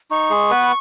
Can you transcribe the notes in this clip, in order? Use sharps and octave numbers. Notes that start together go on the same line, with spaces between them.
D#4 C#6
G#3 G#4
B3 B4